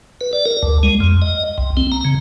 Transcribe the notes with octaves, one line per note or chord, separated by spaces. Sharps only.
B4
D5
A#4
D2
G#3
F2
D#5
C2
C4
A#5
C#3